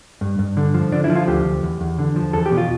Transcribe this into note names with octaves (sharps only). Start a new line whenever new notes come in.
G2
G2
D3
F3
D3 D4
E4
F3
F4
D2 G4
D2
E2
E2
D3
F3
E2 A4
G4
B2
F4